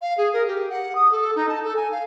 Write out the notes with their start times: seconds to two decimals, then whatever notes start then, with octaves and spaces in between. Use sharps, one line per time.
0.02 F5
0.18 G#4
0.33 A#4
0.47 G4
0.70 F#5
0.95 D#6
1.12 A4
1.36 D#4
1.49 A5
1.64 A4
1.76 G#5
1.92 F5